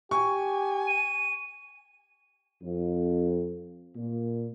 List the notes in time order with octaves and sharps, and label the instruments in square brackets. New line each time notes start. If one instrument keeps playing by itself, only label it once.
[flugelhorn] G4 [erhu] G#5 [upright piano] C#6
[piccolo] D#7
[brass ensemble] F2
A#2